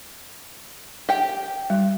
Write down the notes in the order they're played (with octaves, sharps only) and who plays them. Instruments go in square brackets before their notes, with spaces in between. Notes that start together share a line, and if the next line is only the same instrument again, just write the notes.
[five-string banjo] G4 G5
[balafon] G3